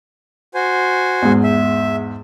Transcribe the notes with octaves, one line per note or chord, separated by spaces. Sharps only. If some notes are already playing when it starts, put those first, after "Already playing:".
F#4 C5 G#5
E2 G#2
E5